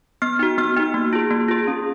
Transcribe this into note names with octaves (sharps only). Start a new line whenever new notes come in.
B3 F6
D#4 F#4
B3 F6
D#4 F#4
A#3
F4 G#4
A#3
F4 G#4
C#4